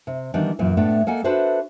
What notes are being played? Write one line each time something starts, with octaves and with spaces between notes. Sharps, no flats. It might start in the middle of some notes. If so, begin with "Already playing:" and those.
C3
D#3 E3 G3 B3 D4 D#4
F#2 A#2 E3
A2 A3 B3 D4
A#3 A4 D#5 F#5 G#5
D4 F#4 A4 B4 C5 E5